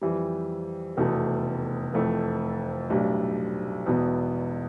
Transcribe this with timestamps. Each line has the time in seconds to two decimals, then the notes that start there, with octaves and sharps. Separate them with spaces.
0.01 F2 E3 G3
0.97 F1 E2 B2 A3
1.94 F1 F2 E3 A3
2.90 B1 A2 G3 D4
3.86 E1 E2 B2 B3